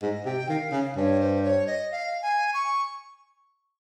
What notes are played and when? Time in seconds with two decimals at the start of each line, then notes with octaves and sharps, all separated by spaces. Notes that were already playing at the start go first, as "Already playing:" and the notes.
0.02 G#2 D#5
0.25 C3 G5
0.49 D#3 F5
0.72 C#3
0.96 G2 C#5
1.21 C5
1.43 C#5
1.67 D#5
1.92 F5
2.22 G#5
2.54 C#6